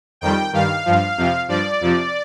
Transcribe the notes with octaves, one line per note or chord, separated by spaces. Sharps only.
F2 D#3 G3 G5
G2 D#3 G3 F5
G2 F3
F2 C3 F3
G2 F3 D5
F2 C3 F3